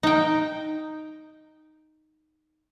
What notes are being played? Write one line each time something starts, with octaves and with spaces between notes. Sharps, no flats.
D#4 G5